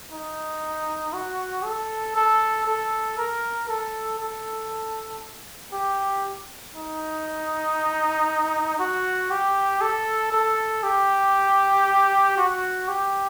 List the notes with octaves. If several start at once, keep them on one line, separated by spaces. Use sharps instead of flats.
D#4
F#4
A4
A4
A4
A#4
A4
A4
G4
D#4
F#4
G4
A4
A4
G4
F#4
G4